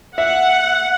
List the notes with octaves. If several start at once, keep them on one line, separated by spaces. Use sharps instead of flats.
E5 F#5